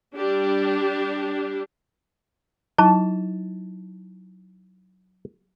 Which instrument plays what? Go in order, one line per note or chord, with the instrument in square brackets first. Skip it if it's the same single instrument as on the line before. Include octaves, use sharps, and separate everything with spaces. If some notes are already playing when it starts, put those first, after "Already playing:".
[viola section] G3 D4 G4
[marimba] F#3 D#4 E4 [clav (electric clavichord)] A5